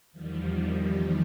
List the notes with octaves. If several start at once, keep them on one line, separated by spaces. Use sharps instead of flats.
E2 D#3 F3 G3